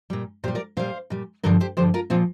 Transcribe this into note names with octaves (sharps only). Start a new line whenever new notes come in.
A#2 G3
A#2 G3 G4 C5
A#4 D5
A#2 G3 C5 F5
A#2 G3
G2 D3 F3 A#4 D5
G4 C5
G2 D3 F3 G4 C5
F4 A#4
A#2 F3 C4 F4